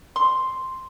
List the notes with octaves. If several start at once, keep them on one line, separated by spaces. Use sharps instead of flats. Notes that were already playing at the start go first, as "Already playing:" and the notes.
C6